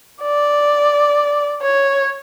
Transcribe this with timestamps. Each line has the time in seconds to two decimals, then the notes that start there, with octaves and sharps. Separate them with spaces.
0.22 D5
1.62 C#5